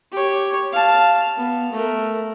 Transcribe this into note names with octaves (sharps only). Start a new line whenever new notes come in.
G4 C#5
F5 A5
B3
A3 A#4